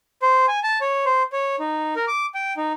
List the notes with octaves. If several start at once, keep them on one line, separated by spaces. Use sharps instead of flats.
C5
G#5
A5
C#5
C5
C#5
D#4
A#4
D6
G5
D#4